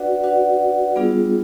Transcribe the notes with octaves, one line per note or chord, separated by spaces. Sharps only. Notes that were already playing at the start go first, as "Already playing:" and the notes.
Already playing: D4 F#4 B4 D5 F#5
D4 F#4 B4 D5 F#5
G3 B3 D4 F4 G#4